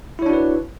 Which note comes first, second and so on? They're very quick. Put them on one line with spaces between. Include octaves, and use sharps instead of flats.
E4 C#5 D4 F#4 B4